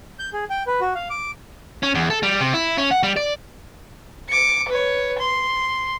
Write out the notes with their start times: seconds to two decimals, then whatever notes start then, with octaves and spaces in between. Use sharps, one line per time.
0.19 G6
0.33 G#4
0.50 G5
0.67 B4
0.81 F#4
0.95 F5
1.10 D6
1.83 C#4
1.95 E2
2.10 A4
2.23 G3
2.40 C3
2.54 E4
2.78 C#4
2.91 F#5
3.03 G3
3.16 D5
4.29 D6 C#7
4.68 B4 C#5
5.18 C6